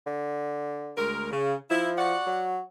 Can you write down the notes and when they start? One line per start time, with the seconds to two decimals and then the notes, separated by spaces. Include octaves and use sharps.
0.07 D3
0.97 D2 G#3 A#4
1.31 C#3
1.70 F3 E4
1.97 F#4 D5 F#5
2.26 F#3